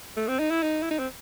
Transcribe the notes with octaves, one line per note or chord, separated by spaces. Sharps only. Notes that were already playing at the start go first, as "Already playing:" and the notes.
A3
C4
D#4
E4
D#4
E4
D#4
C4